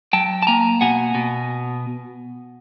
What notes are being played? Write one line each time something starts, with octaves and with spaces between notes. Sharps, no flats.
F#3 G5 A5
A5
A#3 G#5 A#5
B2 F#5 G#5
B2